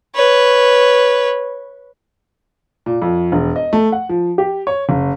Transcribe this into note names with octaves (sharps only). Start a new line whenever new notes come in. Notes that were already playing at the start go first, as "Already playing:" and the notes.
B4 C#5
A#2
F2
E1
D#5
A3
F#5
F3
G4
C#5
F#1